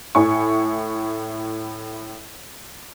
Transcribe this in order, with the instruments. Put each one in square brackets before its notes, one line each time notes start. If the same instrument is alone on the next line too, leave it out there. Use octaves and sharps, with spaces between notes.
[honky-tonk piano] A2 E4 G#5 C#6